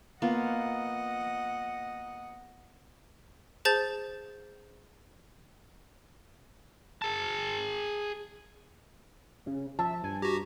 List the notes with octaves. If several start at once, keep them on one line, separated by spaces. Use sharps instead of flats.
A#3 B3 F4 D#5 F#5
G#4 C5 A5 G6 A6
G#4 A5
C#3
F3 E5 A5
G2 G#5
F#4 G4 A#5